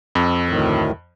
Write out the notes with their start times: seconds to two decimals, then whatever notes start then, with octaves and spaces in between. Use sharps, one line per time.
0.15 F2
0.49 D2 A2 D#3